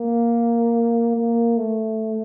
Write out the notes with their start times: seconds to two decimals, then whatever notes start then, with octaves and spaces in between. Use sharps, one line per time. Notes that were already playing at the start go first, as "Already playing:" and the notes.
Already playing: A#3
1.16 A#3
1.57 A3